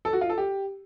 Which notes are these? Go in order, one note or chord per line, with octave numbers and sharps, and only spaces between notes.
A4
F#4
F4
A4
G4